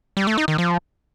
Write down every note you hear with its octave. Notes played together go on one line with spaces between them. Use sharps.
G3
A3
D#4
D#3
F3